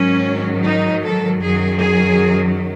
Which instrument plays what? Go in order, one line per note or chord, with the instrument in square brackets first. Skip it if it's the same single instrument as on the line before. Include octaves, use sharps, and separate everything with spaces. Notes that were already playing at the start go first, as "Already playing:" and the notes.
Already playing: [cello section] G#2 D#3 F#3 C#4
D#4
A4
F#2 D#3 F#3 G#4
G#4